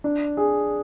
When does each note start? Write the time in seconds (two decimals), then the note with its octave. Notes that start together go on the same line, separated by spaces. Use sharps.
0.04 D4
0.37 G#4